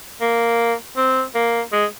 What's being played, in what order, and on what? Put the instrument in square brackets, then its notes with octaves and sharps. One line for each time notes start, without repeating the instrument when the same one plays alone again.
[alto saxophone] A#3
C4
A#3
G#3